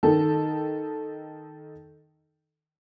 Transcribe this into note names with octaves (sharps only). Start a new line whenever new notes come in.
D#3 D#4 A4